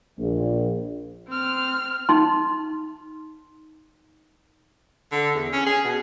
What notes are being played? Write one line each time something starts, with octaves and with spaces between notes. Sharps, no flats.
A#1
C4 F6
D#4 C6
D3
E2
C#4
G#4
B2